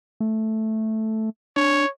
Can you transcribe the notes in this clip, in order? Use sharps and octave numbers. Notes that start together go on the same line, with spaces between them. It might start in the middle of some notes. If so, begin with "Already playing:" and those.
A3
D4 C#5